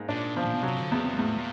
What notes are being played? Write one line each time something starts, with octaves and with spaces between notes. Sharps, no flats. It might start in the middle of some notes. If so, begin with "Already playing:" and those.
Already playing: G#2 A#3
A#2 D4
B2 F3
A#2
B2
C3 F#3
D3
E2 C#3
C3
G#2
E2 A2
A#2